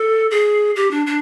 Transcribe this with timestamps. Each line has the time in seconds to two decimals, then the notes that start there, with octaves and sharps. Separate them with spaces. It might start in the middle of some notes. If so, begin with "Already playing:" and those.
Already playing: A4
0.31 G#4
0.76 G4
0.91 D4
1.06 D4